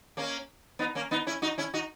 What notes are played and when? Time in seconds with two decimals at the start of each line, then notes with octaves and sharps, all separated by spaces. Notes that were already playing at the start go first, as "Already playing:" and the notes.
0.17 A#3 C#4
0.79 B3 D#4
0.95 A#3 C#4
1.11 B3 D#4
1.27 C#4 E4
1.42 D#4 F#4
1.58 C#4 E4
1.74 D#4 F#4